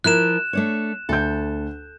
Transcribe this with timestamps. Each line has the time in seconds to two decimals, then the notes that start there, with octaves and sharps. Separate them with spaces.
0.04 F3 E4 A#4 F#6 E7
0.53 A3 D4 C#5
1.09 D2 A4 G6